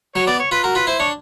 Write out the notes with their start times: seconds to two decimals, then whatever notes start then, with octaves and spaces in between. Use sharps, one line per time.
0.15 F#3 C#5
0.27 B3 D5
0.39 C#5
0.51 F4 B4
0.63 F#4 A#4
0.75 F4 B4
0.87 E4 C5
0.99 D4 C#5